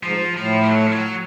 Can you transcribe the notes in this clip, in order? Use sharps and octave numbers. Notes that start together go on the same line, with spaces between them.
G#2 F3
A2 F3
G3
F#3
F3
F#3